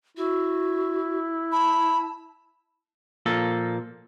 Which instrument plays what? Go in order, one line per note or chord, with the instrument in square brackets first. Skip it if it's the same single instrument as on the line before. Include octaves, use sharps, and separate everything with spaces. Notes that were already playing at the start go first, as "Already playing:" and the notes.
[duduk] E4 [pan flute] F#4
[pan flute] A5 [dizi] B5
[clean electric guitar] A#2 F3 A#3 A4